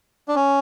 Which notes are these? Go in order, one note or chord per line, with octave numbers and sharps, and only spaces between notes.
D4
C#4